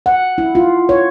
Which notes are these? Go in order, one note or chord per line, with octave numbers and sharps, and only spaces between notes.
F#5
E4
F4
C#5